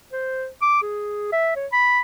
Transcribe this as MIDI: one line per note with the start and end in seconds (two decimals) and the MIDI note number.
0.12 0.47 72
0.62 0.81 86
0.82 1.28 68
1.32 1.56 76
1.56 1.67 73
1.72 2.01 83